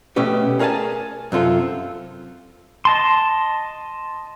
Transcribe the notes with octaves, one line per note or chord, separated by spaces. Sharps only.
B2 A3 C#4 G4 B4
G#4 A#4 C#5 F5 G#5 A5
F#2 C3 F4 A4
D#5 A5 C6